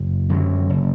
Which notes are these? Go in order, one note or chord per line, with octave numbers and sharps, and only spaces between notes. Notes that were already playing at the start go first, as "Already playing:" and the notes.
Already playing: F#1
F#2 D3 F#3
F#1